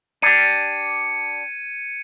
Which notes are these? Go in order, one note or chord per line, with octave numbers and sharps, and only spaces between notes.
D4 G4 G#6 C#7 D#7